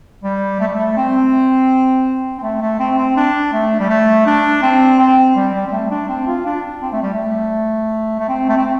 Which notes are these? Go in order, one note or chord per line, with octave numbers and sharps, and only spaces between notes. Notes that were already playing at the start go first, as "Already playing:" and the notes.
G3
A3
G3
A3
C4
C4
A3
A3
C4
C4
D4
A3
G3
A3
D4
C4
C4
G3
G3
C4
A3
D4
C4
F4
D4
C4
A3
G3
A3
A3
C4
A3
C4